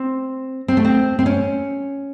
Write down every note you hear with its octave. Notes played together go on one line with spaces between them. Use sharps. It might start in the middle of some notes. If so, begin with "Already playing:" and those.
Already playing: C4
C4
A3
C4
C4
C#4